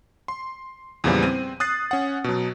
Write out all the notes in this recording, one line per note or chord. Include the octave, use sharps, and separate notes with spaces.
C6
E2 A#2 C#3 E3 F3 G3
C4 D#7
D#6 F#6 A6 C7
C#4 F#5
B2 F#3